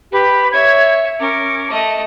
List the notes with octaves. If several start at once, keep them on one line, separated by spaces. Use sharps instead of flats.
G4 B4 B5
C#5 E5 G#6
C#4 A#4 D6
A3 D#5